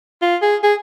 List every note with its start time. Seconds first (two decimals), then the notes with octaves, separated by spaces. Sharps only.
0.22 F4
0.42 G#4
0.63 G#4